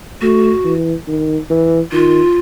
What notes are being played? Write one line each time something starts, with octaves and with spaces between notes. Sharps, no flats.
A3 F#4
E3
D#3
E3
D#3 F4